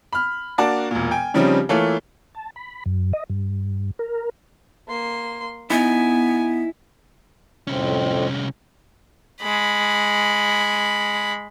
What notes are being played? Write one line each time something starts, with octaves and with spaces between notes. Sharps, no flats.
B5 F6
A#3 D4 F#4 D5 A5
E1 A#2
G5 G#5
C#3 F3 G3 C4 C#4 D#4
E3 A3 A#3 F4 A4 C#5
A5
B5
F#2
D#5
G2
A#4
A#3 C6
B3 D#4 E4 G#5
C2 F2 A2 C4 C#4
G#3 B5